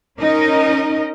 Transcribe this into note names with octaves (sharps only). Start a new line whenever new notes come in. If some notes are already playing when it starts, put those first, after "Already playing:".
C#4 D#4 A#4 D#5